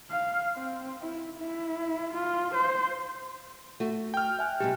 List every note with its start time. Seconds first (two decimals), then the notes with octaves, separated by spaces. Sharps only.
0.10 F5
0.55 C4
1.02 E4
1.38 E4
2.14 F4
2.55 C5
3.80 A3 F#4
4.14 G5 F6
4.39 E5 G#5 F#6
4.60 B2 F#3 G#3 G4